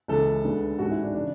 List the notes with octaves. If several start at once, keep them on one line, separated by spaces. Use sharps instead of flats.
C#2 C#3 E3 G#3 A4
D2 D3 G#3 B3
A1 G#2 G#3 F#4
E4
D4
C#3 E3 D4